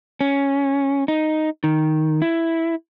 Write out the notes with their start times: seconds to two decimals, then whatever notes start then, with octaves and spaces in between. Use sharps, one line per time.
0.21 C#4
1.08 D#4
1.64 D#3
2.22 E4